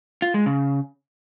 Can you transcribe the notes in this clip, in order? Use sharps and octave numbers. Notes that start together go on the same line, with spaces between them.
F4
G#3
C#3